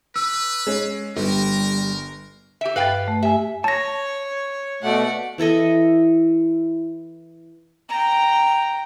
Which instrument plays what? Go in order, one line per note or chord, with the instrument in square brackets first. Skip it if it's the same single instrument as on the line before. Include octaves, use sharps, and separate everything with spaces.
[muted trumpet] B4 [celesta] E6
[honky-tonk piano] G#3 C#4
[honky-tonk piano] G1 [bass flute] G3 [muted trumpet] A#4
[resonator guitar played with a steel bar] G4 E5
[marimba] G2 A6 [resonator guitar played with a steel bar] B4 F5 G5
[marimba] A3
[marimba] G4 G#5 [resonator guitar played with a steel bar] E5
[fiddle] C#5 [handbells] A5 A#6
[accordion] B2 A3 [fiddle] D5 F#5
[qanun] E3 E4 A4 D#5
[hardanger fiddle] G5 A#5